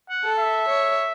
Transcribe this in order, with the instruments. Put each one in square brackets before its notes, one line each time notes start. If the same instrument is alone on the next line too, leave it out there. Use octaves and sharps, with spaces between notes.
[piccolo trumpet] F#5
[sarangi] A4
[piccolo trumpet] E5
[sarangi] C#5